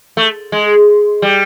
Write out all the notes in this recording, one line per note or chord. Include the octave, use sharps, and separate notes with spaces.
A3
G#3
G3